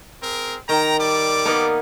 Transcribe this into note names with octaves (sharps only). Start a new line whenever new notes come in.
C4 G#4 A#4
D#3 G5 A#5
G3 D5 D6
A#3 B3 D#4